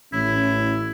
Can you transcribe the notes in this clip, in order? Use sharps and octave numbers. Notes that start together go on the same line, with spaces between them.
A1 C#4 E4